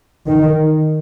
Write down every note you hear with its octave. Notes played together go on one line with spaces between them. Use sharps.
D#3